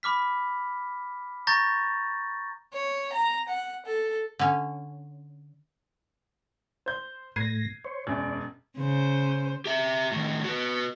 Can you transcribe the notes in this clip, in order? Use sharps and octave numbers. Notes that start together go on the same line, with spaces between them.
B5 D6 F6 B6
A#5 C#6 G6 A6 A#6
C#5
A#5
F#5
A4
D3 C#4
C5 G6
A2 G#6 A#6 C7 D#7
C5 C#5
E1 F#2 D5
C#3 C5
G4 E5
A2 D#3
F#4 B4